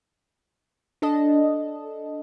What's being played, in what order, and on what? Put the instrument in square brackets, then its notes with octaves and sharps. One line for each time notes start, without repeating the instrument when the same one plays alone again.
[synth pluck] D4 A4 D#5